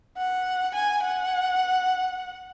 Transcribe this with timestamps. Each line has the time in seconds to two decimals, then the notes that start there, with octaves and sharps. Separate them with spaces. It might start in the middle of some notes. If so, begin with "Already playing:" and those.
0.17 F#5
0.74 G#5
1.03 F#5